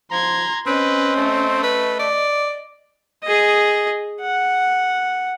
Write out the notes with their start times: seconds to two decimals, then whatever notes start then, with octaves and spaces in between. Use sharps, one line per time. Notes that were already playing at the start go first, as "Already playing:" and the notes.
0.11 F3 A#5 C6 G#6
0.67 C4 C#4 B4 D#5
1.16 A3
1.63 B4 D#5
1.99 D5
3.24 G#4 D#5
4.21 F#5